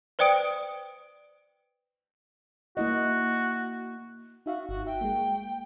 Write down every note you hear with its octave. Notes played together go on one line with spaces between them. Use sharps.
B4 C5 D5 G5 D#6 D7
A#3 E4 F#4 D#5
D#4 F#4 E5 F5
G1 F#4
E5 G5
G#3 A#3